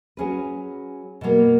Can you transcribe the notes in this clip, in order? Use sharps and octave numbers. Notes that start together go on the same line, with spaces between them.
F#3 C#4 G#4 B4
B2 F#3 A#3